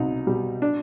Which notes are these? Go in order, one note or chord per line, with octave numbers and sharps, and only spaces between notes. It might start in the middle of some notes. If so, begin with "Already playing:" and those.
Already playing: C2 B2 D#4
B2 G3
D4